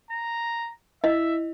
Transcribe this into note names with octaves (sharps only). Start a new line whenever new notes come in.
A#5
E4 D#5 E5